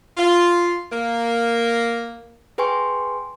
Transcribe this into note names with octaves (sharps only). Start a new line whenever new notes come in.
F4
A#3
G#4 B4 G5 G#5 C6 C#6